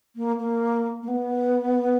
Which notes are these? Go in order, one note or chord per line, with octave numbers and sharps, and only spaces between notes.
A#3
A#3
A#3
B3